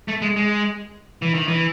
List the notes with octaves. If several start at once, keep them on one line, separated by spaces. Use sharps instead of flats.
A3
G#3
G#3
E3
D#3
E3